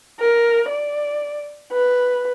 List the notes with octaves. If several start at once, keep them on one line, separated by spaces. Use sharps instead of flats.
A#4
D5
B4